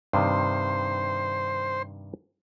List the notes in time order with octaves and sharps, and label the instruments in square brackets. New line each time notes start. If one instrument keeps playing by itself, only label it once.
[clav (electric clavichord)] G2 C3 D#3 [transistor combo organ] C5